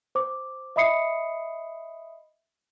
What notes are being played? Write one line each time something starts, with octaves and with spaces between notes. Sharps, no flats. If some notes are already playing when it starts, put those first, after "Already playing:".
C5 D6
D#5 E5 B5 D#6 C7 C#7